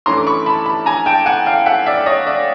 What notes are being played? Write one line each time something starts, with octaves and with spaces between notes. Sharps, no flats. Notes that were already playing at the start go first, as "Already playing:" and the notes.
G2 E3 A3 C#4 E4 A#5 C6
D6
B5 C#6
A5 B5
A5 B5
G#5 A#5
G5 A5
F#5 G#5
F5 G5
E5 F#5
D5 E5
E5
C#5 D#5
D5 E5